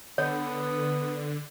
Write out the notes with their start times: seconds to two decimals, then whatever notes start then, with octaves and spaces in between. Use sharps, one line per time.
0.18 D3 B3 C#5